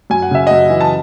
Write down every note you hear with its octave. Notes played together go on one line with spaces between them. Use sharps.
F#2 G#5
F#5
C#3 E5
F#2 D#5 F#5
E3
A5